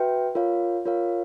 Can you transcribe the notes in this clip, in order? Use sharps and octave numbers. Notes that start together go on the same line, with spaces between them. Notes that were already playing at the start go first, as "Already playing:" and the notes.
Already playing: F#4 B4 E5 G5
F4 A#4 C#5 F5
F4 A#4 C#5 F5